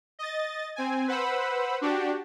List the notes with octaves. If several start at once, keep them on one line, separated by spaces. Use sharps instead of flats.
D#5 A6
C4 G#5
B4 C5 F#5 B5 E6
D4 F#4 G4